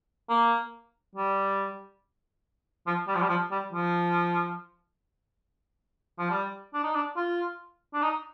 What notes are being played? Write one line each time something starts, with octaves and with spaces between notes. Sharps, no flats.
A#3
G3
F3
G3
F3
G3
F3
G3
F3
F3
G3
D4
D#4
D4
F4
D4
D#4